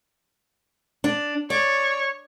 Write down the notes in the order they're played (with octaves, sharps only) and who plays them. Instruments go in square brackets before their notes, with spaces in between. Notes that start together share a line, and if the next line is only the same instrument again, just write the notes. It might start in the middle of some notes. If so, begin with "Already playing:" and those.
[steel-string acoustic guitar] D4
[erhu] C#5 [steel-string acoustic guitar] D5